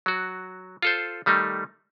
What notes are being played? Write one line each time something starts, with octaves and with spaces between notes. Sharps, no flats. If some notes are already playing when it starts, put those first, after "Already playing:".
F#3 F#4
F4 A4 C5
D#3 G3 A3 D#4